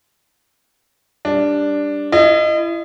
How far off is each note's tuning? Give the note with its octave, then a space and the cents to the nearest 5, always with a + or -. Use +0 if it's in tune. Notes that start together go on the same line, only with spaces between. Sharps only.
G3 +20 D4 +0
E4 +35 D#5 -15